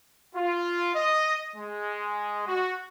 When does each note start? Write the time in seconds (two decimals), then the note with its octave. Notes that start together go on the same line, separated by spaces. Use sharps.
0.34 F4
0.95 D#5
1.55 G#3
2.47 F#4